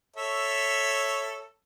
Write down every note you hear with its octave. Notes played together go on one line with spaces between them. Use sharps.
A4 C#5 E5